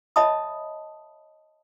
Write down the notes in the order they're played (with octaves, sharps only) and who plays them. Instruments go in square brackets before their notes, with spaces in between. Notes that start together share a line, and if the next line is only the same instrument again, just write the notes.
[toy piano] C#5 D#5 E5 A5 B5 D#6